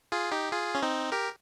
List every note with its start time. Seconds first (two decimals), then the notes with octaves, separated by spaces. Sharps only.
0.12 F4 G#4
0.32 D#4 G4
0.52 F4 G#4
0.75 C#4
0.82 C4 D#4
1.12 G4 A#4